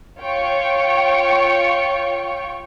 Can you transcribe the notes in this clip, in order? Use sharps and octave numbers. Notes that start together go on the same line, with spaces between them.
F4 C#5 G5 C#6